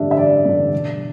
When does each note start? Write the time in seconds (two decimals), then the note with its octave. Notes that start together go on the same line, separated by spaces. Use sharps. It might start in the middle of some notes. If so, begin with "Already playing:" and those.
Already playing: A1 G2 D3 G3 D4 E5
0.11 E5
0.18 A1 D5
0.45 G2 D3 G3 D4
0.72 E1